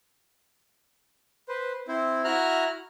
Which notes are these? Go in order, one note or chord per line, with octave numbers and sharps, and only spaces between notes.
B4 C5
C4 E4 C5
E4 F#4 E5 A#5 F6 F#6